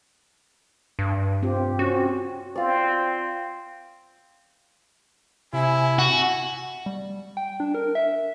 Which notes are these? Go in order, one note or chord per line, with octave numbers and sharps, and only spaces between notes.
G2
C4 F4 G4
C4 C#4 F#4
C4 F4 D5
C3 E4 G#5
F#4
G3
G5
D4
A#4
E5